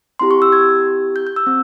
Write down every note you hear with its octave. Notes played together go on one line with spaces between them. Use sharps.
C4 E4 G4 C6
C#6
E6
G#6
G6
G6
E6
C4